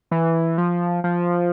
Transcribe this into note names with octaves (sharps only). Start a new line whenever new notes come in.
E3
F3
F3